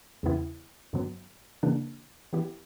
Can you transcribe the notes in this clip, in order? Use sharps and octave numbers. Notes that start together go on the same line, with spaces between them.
E2 C#3 E3 B3 E4
G2 D3 F#3 B3
C#3 E3 A#3 D4
E3 B3 E4 G4